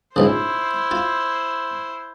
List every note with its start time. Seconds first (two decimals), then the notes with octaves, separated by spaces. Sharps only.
0.16 A#1 G#2 C#3 E4 C5
0.91 F4